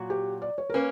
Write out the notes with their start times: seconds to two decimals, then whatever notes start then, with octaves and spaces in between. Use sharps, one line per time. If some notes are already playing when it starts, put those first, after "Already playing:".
Already playing: A#2 F#3 F#4
0.10 G4
0.42 D5
0.58 C#5
0.70 A#4
0.74 A#3 C#4 B4